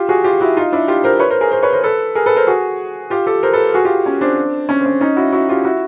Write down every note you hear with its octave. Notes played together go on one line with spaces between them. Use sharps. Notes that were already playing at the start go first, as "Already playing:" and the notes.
Already playing: F4 G4
F#4 G#4
F4 G4
E4 F#4
D#4 F4
D4 E4
F4 G4
A#4 C5
B4 C#5
A#4 C5
G#4 A#4
A#4 C5
B4 C#5
A#4 C5
A4 B4
G#4 A#4
A4 B4
A#4 C5
F#4 G#4
F4 G4
G4 A4
A#4 C5
A4 B4
F#4 G#4
F4 G4
C#4
C4 D4
C#4
C4
C#4
C#4 D#4
E4 F#4
E4 F#4
F4 G4
E4 F#4